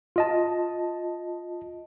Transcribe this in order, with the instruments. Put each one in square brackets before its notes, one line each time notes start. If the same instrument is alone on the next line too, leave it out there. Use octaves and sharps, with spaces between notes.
[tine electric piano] F4 D#5 A5